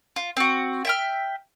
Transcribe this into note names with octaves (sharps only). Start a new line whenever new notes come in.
F4
C4 F#4
E5 G5 F6